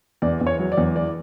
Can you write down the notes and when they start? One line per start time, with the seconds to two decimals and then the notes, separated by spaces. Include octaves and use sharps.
0.22 E2 D5
0.41 E2
0.47 C#5
0.59 F#3
0.72 D5
0.78 E2
0.95 E3 D5